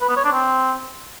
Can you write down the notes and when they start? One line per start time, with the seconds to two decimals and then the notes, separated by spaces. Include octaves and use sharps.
0.01 B4
0.09 B3
0.17 C#5
0.25 D4
0.33 C4